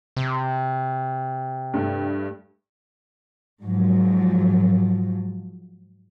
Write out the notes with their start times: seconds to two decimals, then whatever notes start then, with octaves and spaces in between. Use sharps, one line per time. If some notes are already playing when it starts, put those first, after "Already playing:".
0.16 C3
1.74 G2 A3
3.62 G#2 F3 F#3